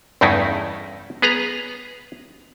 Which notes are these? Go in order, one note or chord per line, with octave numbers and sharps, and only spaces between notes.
E2 G2 C#3 A3 D#4 E4
B3 G#4 B4 A#5